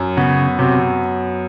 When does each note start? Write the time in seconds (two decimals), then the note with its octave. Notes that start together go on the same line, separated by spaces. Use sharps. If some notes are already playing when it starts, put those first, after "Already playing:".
Already playing: F#2
0.17 C#3 B3
0.59 C3 F#3